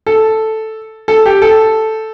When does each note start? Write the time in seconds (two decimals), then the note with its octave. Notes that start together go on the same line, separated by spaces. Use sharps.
0.07 A4
1.08 A4
1.26 G4
1.42 A4